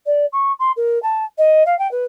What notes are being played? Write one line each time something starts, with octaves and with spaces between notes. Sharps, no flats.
D5
C#6
C6
A#4
A5
D#5
F5
G5
B4